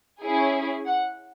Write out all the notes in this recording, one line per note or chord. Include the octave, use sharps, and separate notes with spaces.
C#4 E4 G#4
F#5